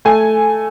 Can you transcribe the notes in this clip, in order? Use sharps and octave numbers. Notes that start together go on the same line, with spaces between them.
A3 G#5